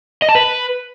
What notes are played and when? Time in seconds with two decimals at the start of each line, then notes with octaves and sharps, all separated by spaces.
0.22 D#5
0.29 A5
0.35 B4